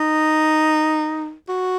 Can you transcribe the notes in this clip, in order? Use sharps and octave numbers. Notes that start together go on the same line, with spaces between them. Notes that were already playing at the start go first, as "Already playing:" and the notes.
Already playing: D#4
F#4